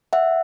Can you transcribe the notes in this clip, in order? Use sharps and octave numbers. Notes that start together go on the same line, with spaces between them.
E5 F#5